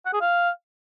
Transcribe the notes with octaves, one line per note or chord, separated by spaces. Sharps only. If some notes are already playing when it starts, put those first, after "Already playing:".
F#5
G#4
F5